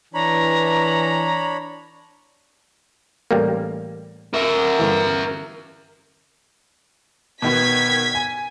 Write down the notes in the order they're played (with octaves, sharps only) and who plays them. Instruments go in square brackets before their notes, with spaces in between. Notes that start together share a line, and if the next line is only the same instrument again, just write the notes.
[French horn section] E3 [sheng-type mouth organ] D4 C#5 B5 [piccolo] A#5
[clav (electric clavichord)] A1 G3 A#3
[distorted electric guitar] A#4 E5
[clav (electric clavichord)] G1 E3
[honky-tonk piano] B2 D#3 B3 [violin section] G#6 B6
[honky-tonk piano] G#5